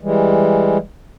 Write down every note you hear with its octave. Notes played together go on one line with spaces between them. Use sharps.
E3 G3 G#3